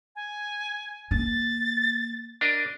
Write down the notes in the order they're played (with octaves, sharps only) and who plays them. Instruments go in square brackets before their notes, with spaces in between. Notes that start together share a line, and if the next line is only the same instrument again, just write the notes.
[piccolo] G#5
[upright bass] A#3 [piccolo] A6
[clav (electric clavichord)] D4 A#4 D#5 [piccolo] D6